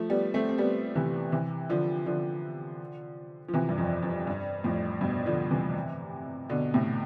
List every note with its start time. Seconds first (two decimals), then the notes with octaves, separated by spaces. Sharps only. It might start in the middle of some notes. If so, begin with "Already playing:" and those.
Already playing: F3 A3
0.10 G3 B3
0.34 A3 C4
0.49 C4
0.58 G3 B3
0.95 C3 E3
1.32 C3 E3
1.69 D3 F3
2.06 D3 F3
3.49 F3
3.54 C3 E3
3.69 G2
3.78 F2
4.03 F2
4.27 G2
4.64 F2 A2
5.01 G2 B2
5.26 D3 F3
5.51 C3 E3
6.49 B2 D3
6.74 A2 C3